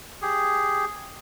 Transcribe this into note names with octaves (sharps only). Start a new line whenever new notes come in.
G4 G#4